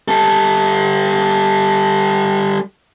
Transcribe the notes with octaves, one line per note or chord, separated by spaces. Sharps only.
G3 A4